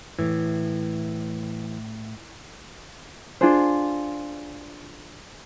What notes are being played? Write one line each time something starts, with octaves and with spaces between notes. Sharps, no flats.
A2 E3
D4 F4 G#4 C5